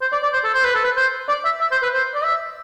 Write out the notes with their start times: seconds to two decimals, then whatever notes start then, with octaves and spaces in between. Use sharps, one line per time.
0.01 C5
0.12 D5
0.23 D5
0.33 C5
0.44 A4
0.54 C5
0.64 B4
0.75 A4
0.84 B4
0.96 C5
1.28 D5
1.45 E5
1.61 E5
1.71 C5
1.82 B4
1.93 C5
2.15 D5
2.24 E5